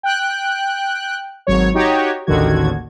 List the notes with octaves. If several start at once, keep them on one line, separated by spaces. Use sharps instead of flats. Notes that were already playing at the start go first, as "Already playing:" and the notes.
G5 F#6
G#1 F#3 C#5
D#4 F#4 G4 C#5 D#5
A1 D#2 D3 D#3 F#4 G#6